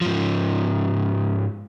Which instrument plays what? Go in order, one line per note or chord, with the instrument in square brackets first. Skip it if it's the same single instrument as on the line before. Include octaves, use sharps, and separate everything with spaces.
[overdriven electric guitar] G#2 F3